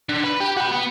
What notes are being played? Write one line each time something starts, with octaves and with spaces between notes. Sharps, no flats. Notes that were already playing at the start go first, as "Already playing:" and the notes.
D3
B4
G4
F#4 B5
B3